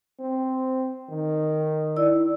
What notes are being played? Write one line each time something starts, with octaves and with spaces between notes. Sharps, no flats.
C4
D#3
E4 D5 E6